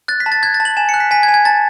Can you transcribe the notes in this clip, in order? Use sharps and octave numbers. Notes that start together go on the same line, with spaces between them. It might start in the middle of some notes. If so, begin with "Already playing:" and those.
F#6 A6
B6
A5
A6
F#6 G#6
A6
A5
F#7
G#5 E7
F#6 C#7
B6
G#5 B6
G#6
G#5
G#6
A5 A6